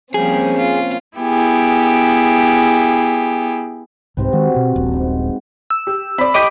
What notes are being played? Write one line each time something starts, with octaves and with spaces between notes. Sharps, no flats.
F3 G3 A#3 C4 C#4 G#4
F4
B3 E4 G4 G#4
C2 G#2 C3 C4 B4
D#3 G#3 F#4
B2 C4
D#1 A#1
G#2
E6
G4
C4 D5 B5
G4 D#5 D6 G6 B6 D7